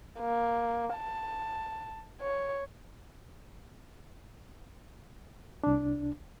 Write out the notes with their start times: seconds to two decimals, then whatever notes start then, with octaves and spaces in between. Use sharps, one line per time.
0.20 A#3
0.95 A5
2.21 C#5
5.64 C2 D4